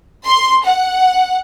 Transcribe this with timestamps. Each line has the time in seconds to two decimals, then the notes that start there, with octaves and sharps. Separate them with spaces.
0.24 C6
0.64 F#5